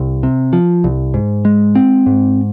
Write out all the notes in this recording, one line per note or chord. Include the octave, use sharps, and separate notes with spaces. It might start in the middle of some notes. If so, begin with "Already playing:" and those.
Already playing: C2
C3
F3
C2
G#2
G#3
C4
G#2